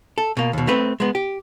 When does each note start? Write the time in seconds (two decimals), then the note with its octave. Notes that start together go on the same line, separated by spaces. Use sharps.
0.18 A4
0.37 B2 A#3
0.53 D#2 B2
0.67 A3 C4 B4
1.00 G#3 B3
1.15 G4